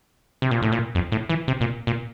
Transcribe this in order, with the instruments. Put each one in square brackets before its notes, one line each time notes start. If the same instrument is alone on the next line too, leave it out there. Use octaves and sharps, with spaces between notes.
[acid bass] C3
A#2
A2
A#2
F2
A2
E3
C3
A#2
A#2